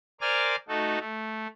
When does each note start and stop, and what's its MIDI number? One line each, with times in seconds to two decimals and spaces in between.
0.21 0.56 70
0.21 0.56 72
0.21 0.56 74
0.21 0.56 80
0.21 0.56 86
0.21 0.56 89
0.69 0.99 57
0.69 0.99 63
0.69 0.99 66
0.69 0.99 69
0.99 1.47 57